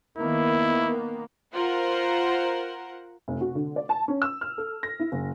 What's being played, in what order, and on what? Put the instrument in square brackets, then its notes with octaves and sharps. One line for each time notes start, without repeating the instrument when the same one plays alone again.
[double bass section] D#3 A#3 B3 [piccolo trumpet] E4
[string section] F4 A#4 C5 F#5
[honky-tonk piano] F1
F#4
D3
D5
A5
C#4
E6
F6
A4
A#6
E4
F#1